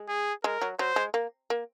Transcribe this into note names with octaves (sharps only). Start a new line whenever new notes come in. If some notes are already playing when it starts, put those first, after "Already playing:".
Already playing: G#3
G#4
G#3 A#4
F#3
F#3 C5
G#3
A#3
A#3